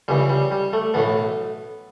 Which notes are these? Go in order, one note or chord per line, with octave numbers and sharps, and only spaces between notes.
C#2 C#3 E3 G3
G3
G3
A3
B1 A2 E3 B3